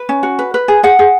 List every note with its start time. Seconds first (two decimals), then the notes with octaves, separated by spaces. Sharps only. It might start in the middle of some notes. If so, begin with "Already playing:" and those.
Already playing: B4
0.09 C#4
0.23 F#4
0.39 B4
0.54 B4
0.68 G#4
0.83 G#4 F#5
0.99 G#4